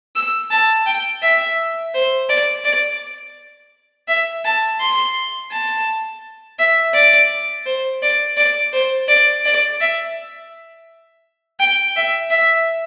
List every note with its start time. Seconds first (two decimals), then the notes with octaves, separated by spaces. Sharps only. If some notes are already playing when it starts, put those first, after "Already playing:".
0.16 E6
0.51 A5
0.87 G5
1.23 E5
1.95 C5
2.29 D5
2.65 D5
4.08 E5
4.45 A5
4.81 C6
5.52 A5
6.59 E5
6.94 D5
7.66 C5
8.03 D5
8.37 D5
8.73 C5
9.09 D5
9.46 D5
9.81 E5
11.60 G5
11.96 E5
12.31 E5